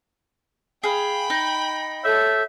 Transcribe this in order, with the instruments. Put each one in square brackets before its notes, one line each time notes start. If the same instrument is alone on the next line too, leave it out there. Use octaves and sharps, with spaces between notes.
[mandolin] G#4 F5 [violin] G5 B5
[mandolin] D#4
[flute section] A4 C#5 G6 [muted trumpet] E5